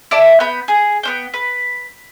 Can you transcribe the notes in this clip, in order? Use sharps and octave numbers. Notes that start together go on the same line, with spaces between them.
E4 D5 A5
B3 B5 G6
G#4
B3 C#4 G5
B4